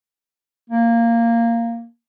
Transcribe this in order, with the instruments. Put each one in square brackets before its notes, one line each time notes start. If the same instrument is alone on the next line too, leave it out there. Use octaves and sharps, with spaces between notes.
[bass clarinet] A#3